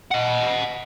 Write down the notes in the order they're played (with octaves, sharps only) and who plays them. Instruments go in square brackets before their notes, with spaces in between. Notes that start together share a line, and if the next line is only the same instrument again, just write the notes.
[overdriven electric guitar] D#5 F#5